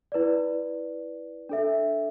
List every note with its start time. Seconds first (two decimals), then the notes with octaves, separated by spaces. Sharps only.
0.12 E4 B4 D5
1.49 D4 A4 E5